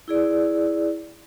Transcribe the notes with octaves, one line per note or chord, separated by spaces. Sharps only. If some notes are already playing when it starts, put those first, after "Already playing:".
E4 G#4 D5